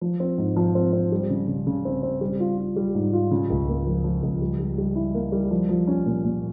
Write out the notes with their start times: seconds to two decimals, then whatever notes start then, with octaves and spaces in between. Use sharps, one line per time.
0.01 F3
0.20 C4
0.38 G#2
0.56 F3
0.75 C4
0.93 C4
1.12 G3
1.30 C#3
1.48 C#3
1.67 C#3
1.85 C4
2.03 C4
2.21 G3
2.40 F4
2.58 F4
2.76 G3
2.95 G#2
3.13 F4
3.31 C#3
3.50 C#2
3.68 A#3
3.87 F3
4.04 F3
4.23 C#2
4.41 G3
4.59 G3
4.78 G3
4.95 E4
5.14 A#3
5.32 G3
5.51 F3
5.69 F3
5.87 C#4
6.06 A#2
6.24 A#2